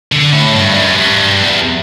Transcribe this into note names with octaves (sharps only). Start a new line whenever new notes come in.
D3
A2
G2
F#2
G2
E2